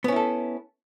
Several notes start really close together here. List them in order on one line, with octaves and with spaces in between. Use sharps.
B3 C#4 E4 A4